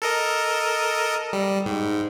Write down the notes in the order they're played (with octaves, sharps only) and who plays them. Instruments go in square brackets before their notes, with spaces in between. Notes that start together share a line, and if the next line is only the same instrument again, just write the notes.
[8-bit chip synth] A4 A#4 D#5
G3
G#2